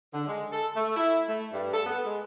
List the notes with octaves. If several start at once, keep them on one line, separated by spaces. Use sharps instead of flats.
D3
G#3
A4
A3
E4
A3
G2
A4
B3
G#3